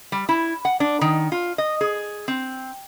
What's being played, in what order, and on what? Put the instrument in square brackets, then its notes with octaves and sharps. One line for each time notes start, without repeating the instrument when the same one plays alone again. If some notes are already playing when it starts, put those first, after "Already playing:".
[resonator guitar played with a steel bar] G3
E4
F#5
D4
D#3
F4
D#5
G#4
C4